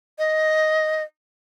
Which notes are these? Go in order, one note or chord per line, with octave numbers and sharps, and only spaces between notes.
D#5